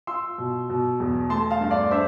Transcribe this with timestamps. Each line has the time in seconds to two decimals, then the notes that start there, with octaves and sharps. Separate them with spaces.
0.07 F4 C6 E6
0.38 B2
0.70 B2
1.00 E2
1.30 A3 A5 C6
1.51 F5 A5
1.61 G2
1.71 D5 F5
1.91 D4 C5 E5